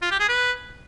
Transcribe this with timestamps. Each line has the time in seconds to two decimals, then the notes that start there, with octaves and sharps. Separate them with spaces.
0.02 F4
0.11 G4
0.20 G#4
0.28 B4